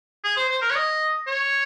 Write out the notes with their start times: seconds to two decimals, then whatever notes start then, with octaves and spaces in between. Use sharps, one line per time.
0.24 G#4
0.37 C5
0.49 C5
0.62 A#4
0.70 C#5
0.76 D#5
1.27 C#5